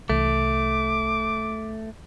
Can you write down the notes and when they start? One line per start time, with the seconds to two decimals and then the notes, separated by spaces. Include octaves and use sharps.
0.10 C2 E3 A3 D6